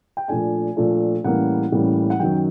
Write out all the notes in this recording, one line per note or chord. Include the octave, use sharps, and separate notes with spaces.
G5
A#2 F3 A3 D4 G#5
A#2 F3 A3 D4
A2 E3 G3 A#3 C#4 F#5
A2 E3 G3 A#3 C#4
F#5
F#2 D#3 F#3 G5